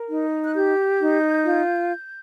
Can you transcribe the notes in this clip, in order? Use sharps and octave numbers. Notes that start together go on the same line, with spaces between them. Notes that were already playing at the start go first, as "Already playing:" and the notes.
Already playing: A#4
D#4
F#6
G4 G6
D#4
F4